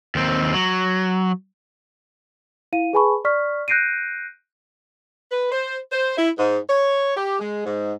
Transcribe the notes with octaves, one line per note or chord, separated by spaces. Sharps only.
D#2 C4
F#3
E4 F5 D#7
G#4 B4 G#5 A5 B5 C#6
D5 C#6 F6 B6
F#6 G6 A#6 C7 D7 D#7
B4
C5
C5
E4
G#2
C#5
G4
G#3
G#2